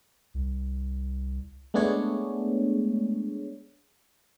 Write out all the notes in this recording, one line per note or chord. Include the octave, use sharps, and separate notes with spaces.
C2
G#3 A3 B3 D4 G#4 C#5